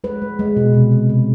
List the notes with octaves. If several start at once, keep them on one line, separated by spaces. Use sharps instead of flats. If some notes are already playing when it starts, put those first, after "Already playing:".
G#3 B4
G#3
G#3
B2
C3
C3
C3